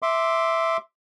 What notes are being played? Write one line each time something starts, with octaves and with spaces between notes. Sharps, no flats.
E5 C6 D6